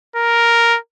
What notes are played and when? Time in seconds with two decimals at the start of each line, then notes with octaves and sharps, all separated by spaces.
0.16 A#4